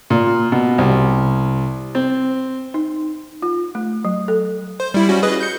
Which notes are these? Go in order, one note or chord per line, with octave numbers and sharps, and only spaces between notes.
A#2
B2
C2
C4
D#4
F4
A3
F#3
A4
C5
G3 E4
G3 C#4 F#4
G#4 B4 D#5
G6 C#7